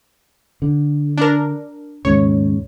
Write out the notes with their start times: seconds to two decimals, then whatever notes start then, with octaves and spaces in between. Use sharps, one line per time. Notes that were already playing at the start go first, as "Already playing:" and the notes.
0.62 D3
1.18 D4 A#4
2.05 D#2 G#2 C#3 C#5